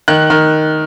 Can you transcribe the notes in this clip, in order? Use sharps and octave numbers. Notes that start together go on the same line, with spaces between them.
D#3 F#6
D#3